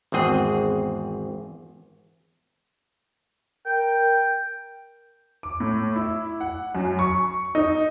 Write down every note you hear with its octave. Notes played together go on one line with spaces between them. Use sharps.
G#1 E2 C4 G#4 F#5
A#4 G5
D6
A2
E4
F#5
F#2
C#6
D#4